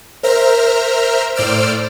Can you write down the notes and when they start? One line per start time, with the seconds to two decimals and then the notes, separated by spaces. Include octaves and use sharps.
0.23 A#4 C5 E5 A#5 F6
1.36 A2 C5 D5 E6 F6 D7